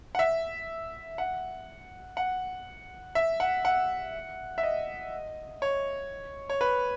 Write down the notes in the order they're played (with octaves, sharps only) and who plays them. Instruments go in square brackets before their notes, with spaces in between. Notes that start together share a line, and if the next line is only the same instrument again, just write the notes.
[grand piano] F#5
E5
F#5
F#5
E5
F#5
F#5
E5
D#5
C#5
C#5
B4